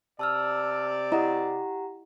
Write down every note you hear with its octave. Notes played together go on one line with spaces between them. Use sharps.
C3 D5 A5 E6 F6
E4 G4 D#5 F#5 A#5